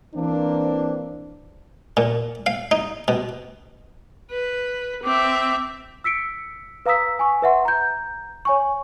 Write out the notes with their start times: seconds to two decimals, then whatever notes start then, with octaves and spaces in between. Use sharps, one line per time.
0.15 E3 A#3 C4 D4
1.97 A#2
2.46 F5
2.71 D#4
3.08 B2
4.31 B4
5.04 C4 E5 D6
6.04 E6 B6 C#7 D7
6.86 B4 F5 A#5 D#6 E6 B6
7.19 G#5 C#6
7.42 B4 E5 F#5 C6
7.65 A#5 G6
8.45 C#5 G#5 C#6